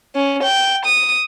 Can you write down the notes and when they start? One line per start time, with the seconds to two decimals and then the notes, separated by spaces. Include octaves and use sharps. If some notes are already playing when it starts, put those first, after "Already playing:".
0.15 C#4
0.43 G5
0.85 D#6